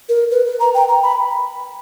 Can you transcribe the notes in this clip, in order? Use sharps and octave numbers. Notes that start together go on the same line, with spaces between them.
A#4
B4
B4
A#5
G5
A#5
B5